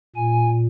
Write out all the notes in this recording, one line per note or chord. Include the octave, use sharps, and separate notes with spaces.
A#2 G#5